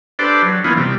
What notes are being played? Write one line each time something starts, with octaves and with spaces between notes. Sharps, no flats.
D4 G4 A4 B4 C5 D5
F#3
E3 A#3 B3 C#4 D#4 F4
C3 G3